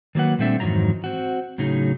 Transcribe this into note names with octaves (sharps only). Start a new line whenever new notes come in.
D#3 F#3 A#3 B4 F#5
A#2 G3 A3 C4 D4 E5
F2 G#2 D#3 E3 F#3 A#5
C4 F#4
A2 C#3 F#3 C#4 D#4 G#4